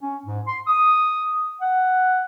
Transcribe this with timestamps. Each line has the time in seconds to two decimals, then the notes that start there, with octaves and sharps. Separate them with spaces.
0.02 C#4
0.25 G#2
0.46 C6
0.68 D#6
1.61 F#5